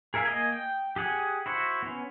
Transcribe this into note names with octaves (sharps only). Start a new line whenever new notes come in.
G#4 A#4 E5 F5 G#5
A#3 D#5 G#5
G5
G4 G#4 F#5 G#5
E4 F#4 C5
B3 C#4